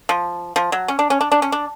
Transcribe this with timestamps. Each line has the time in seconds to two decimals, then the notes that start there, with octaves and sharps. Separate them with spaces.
0.09 F3
0.56 F3
0.72 F#3
0.88 C#4
0.99 D4
1.10 C#4
1.21 D4
1.32 D4
1.42 C#4
1.52 D4